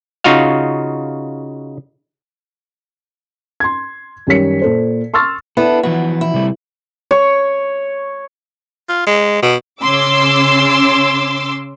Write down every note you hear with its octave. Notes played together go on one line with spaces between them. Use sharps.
C#3 D#4 F4 F#4 F5
C6 G#6
F#2 D#3 G3 C#5 B6 C#7
A#2 A4 C5
C6 C#6 E6 F6 A6
B3 D4 E4 A4
E3 F3 B3 F#4
E4
C3 G3 A3
C#5
F4
G#3
B2
C#3 C#4 C6 D6 E6